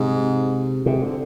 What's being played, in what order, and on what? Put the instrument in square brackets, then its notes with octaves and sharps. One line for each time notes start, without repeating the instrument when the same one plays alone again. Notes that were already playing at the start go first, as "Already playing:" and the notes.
Already playing: [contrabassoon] G#2 [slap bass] C3
[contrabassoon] G#2 [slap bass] C3
[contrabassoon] D3